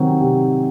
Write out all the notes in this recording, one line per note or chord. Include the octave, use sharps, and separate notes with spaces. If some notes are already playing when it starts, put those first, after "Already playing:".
Already playing: C3 D#3 F#3 C4 F#4
C3